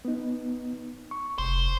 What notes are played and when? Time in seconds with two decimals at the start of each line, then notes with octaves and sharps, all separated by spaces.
0.05 B3 D#4
1.11 C#6
1.38 F1 C5